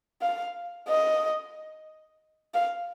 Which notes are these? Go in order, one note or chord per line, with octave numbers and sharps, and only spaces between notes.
F5
D#5
F5